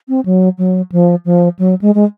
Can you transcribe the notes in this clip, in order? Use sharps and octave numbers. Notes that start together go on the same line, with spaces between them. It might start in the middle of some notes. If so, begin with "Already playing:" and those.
C4
F#3
F#3
F3
F3
F#3
G#3
G#3